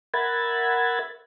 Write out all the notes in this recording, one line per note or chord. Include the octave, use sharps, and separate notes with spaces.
A#4 E5 F#5 B5 G#6 A6